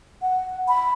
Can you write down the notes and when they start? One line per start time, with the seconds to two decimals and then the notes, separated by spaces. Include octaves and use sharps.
0.22 F#5
0.68 B5